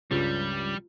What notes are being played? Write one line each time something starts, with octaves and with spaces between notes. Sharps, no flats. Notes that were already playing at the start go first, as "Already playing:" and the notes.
C#2 G2 C#3 G3 F4